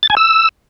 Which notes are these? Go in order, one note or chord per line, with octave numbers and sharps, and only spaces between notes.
A6
G#5
E6